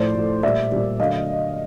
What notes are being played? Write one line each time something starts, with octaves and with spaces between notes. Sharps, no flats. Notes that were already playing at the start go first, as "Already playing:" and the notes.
Already playing: A2 F3 A3 C5 D5
A2 F3 A3
A#2 G3 D5 E5
A#2 G3
D3 F#3 A3 D#5 F5